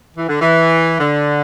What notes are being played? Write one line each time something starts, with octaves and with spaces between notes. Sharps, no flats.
E3
D3
E3
D3